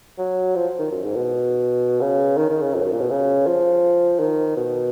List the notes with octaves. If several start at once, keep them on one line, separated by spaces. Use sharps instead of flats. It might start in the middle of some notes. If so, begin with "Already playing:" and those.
F#3
F3
D#3
F#2
G#2
B2
C#3
D#3
D#3
C#3
F2
F#2
A#2
B2
C#3
F3
D#3
B2